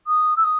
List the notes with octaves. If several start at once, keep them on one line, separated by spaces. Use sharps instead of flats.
D#6
E6
D#6